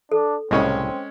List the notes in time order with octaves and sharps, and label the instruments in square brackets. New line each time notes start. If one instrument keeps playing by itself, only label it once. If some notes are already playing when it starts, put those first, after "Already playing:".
[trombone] D4 [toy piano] A4
[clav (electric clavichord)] C2 A2 C#3 [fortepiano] G#3 C#4 C#5 [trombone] C4